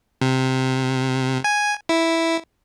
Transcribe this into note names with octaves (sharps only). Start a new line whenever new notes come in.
C3
G#5
E4